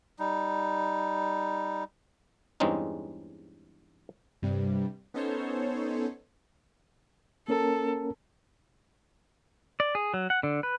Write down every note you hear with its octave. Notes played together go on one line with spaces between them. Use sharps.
G3 D#4
E2 G2 G#3 C4 C#4 D#4
G2 C3 G3
B3 C#4 D#4 A4 C5 C#5
A#3 C#4 A4 A#4
D5
G#4
F#3
F#5
D3
B4